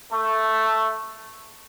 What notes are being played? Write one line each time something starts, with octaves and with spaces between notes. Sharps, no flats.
A3